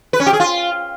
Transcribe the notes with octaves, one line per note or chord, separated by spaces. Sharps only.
B4
C#4
G4
G#4
F4